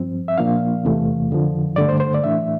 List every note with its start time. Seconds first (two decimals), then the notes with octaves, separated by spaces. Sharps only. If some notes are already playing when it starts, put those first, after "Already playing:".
Already playing: G2 F3 C4
0.28 E5
0.38 A#2 F3 A#3 D4 F5
0.84 E2 C3 E3 A3
1.30 F2 D3 F3
1.76 G2 D3 A3 D5
1.89 C5
2.00 C5
2.14 D5
2.23 A2 E3 A3 D4 E5